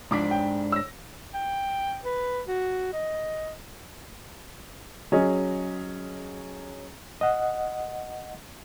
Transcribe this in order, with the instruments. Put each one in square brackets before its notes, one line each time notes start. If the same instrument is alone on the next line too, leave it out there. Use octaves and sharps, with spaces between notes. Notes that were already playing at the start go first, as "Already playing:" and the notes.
[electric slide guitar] G#2 D4 [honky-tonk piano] F3 D6 B6
[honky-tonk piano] G5
E6 A#6
[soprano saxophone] G5
B4
F#4
D#5
[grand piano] F#3 C#4 G#4 D#5
[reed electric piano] D#5 F#5